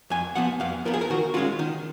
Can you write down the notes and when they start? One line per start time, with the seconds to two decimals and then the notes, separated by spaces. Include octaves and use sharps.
0.10 F2 G#5
0.35 F3 B3 F#5
0.60 F2 F5
0.85 F3 B3 A#4
0.94 G#4
1.01 A#4
1.10 D#3 F#4
1.34 G#3 C#4 F4 F#4
1.59 D#3